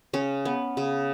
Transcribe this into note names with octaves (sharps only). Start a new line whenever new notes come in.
C#3 C#4
B3
C#3